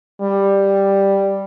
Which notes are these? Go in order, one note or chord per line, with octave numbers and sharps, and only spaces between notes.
G3